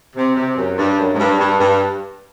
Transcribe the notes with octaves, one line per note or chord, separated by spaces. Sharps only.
C3
C3
F#2
G2
F#2
G#2
G2
G2
G2